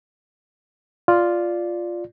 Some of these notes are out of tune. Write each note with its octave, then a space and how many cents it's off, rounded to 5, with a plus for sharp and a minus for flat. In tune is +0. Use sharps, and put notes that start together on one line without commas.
F4 +0 D5 +0